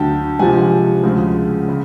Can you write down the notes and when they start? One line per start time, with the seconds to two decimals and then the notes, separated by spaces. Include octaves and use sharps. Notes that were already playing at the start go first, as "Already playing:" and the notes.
Already playing: D2 D3 F#3 G5 A5
0.39 C#2 C3 F3 F#5 G#5
1.03 D2 C#3 F3 G#3
1.69 C#3